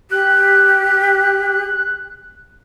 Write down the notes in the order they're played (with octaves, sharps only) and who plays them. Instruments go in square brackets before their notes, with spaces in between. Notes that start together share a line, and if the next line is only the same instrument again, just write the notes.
[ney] G4 [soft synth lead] F#6